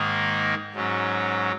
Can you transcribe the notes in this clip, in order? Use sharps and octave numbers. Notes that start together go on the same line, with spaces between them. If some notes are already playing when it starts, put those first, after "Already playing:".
Already playing: G#2 D#3 A#3 D#4 G#4
G#2 F#3 C#4